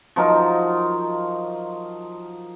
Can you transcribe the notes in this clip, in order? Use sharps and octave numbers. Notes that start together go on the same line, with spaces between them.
F3 F#3 D#4 A#4